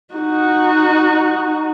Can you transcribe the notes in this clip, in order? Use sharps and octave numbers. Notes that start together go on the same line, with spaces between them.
D#4 F#4